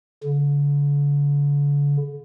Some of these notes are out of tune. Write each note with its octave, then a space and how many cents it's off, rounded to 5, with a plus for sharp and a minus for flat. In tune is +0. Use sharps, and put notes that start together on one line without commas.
D3 -40